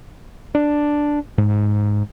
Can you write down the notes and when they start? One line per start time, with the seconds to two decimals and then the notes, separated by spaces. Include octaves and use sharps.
0.55 D4
1.38 G#2